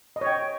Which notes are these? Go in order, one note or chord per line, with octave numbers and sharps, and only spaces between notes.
D#5
C#5
G5